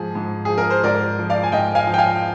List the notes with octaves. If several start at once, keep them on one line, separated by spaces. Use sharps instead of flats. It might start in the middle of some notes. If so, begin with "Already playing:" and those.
Already playing: G#2 F3 G#4
G#2
F3 G#4
A#4
C5
G#2 A#4 D5
F3
D5 F5
G#5
G#2 D#5 G5
F5 G#5
F3
G5
F5 G#5